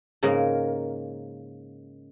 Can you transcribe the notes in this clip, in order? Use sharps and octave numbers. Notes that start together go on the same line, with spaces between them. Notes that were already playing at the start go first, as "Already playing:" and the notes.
G#2 C#3 A#3 A#4